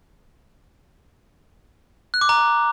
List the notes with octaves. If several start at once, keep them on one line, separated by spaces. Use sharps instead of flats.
F#6
D6
A#5